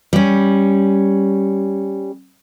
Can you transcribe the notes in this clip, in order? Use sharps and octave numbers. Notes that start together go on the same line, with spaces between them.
G3 C#4